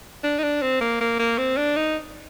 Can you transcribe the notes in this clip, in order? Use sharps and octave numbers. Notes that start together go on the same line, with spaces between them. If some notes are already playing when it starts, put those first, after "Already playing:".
D4
D#4
D4
C4
A#3
A#3
A#3
C4
D4
D#4